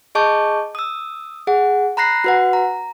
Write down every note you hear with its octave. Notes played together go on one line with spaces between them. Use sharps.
G#4 D#5 A5 C#6 D6 G6
D#6 E6
G#4 F#5
A#5 B5 F#6 A#6 C7
F#4 B4 F#5
A#5